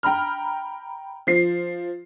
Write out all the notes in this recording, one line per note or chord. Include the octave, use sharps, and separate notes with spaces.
G5 A#5 B5 F6
F3 C7